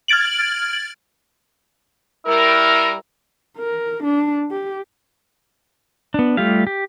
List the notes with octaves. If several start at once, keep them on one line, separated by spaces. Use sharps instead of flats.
F6 G#6 A6 D7 F#7
G3 E4 A#4
A#4
D4
G4
B3 D4
G3 A3 F4 G4 F5
G4